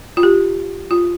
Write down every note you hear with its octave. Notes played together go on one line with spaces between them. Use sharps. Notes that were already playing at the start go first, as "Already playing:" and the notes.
F4
G4
F4